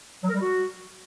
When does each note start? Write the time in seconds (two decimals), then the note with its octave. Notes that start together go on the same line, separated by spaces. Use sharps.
0.23 F#3
0.29 A#4
0.35 G3
0.41 F#4